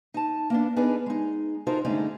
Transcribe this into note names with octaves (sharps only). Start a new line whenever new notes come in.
D#4 A5
A#3 B3 D4
B3 D4 D#4 G#4 A#4 B4
G#3 D#4
D#4 F4 F#4 A4 A#4 C5
G2 D3 G#3 A3 C#4 D#4